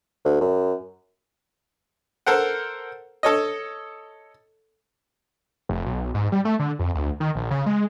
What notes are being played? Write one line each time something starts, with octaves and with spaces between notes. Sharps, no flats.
D2
F#2
A4 A#4 C5 F#5
A4 C#5 D#5
F1
B1
G#2
G3
A3
D3
F2
D2
D#3
A#1
C#3
G#3